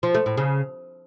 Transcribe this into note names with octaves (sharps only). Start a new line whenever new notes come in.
F3
A3
A2
C#3